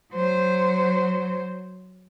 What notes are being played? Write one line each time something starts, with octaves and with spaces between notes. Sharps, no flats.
F#3 C5